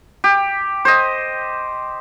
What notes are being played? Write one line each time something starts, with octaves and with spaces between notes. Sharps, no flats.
G4
C5 D#5